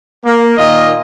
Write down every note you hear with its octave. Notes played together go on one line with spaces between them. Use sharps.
A#3
A#2 D#3 F4 D#5